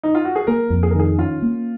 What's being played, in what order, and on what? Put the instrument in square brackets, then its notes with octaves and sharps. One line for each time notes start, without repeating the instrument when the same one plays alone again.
[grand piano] D#4
F4
F#4
G#4
[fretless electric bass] A#3 [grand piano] A#4
[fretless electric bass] F2
[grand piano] G#4
A#4
[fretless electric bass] D#3 [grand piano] G#4
[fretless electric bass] C#4 [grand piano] F4
[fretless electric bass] A#3